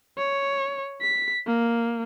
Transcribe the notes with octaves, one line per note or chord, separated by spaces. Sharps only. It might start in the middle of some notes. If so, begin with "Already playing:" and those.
C#5
B6
A#3